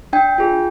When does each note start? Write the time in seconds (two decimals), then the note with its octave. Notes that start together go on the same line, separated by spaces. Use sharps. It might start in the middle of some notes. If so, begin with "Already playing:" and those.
0.13 D4 G5
0.38 F4 G#4